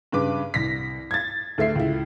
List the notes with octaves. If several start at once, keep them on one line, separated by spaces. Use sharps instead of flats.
G2 C#3 B4 D6
C2 A#6 B6
G#6 A6
D2 A3 E5 C7
C#2 E4